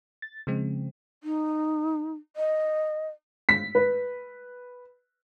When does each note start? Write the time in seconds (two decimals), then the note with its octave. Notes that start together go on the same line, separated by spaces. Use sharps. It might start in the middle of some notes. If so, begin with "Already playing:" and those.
0.22 A6
0.47 C#3 F3 G#3 C4
1.24 D#4
2.36 D#5
3.49 B6
3.75 B4